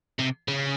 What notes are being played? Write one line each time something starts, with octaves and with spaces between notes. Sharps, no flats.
C3
C#3